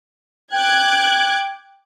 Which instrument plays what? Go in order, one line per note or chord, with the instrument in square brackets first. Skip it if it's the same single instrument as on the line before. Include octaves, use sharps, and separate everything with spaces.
[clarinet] G5 [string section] D6 F#6 G#6